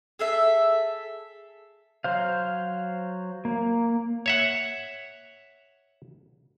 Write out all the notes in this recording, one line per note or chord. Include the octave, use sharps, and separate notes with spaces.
G#4 A4 E5
F#3 C5 F5
A#3
C#5 E5 F#5